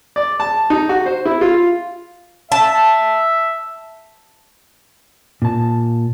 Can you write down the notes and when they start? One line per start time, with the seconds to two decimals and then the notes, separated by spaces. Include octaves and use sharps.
0.16 D5
0.40 A5
0.70 D#4
0.89 F#4
1.06 C5
1.25 E4
1.41 F4
2.52 E5 A5
5.42 A#2 A5